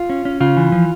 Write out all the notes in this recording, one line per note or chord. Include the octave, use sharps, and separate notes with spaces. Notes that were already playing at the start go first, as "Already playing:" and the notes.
Already playing: F4
C#4
C#4
C#3 F4
E3
F3